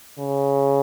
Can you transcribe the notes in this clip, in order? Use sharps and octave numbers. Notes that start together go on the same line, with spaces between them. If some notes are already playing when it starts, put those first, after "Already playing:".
C#3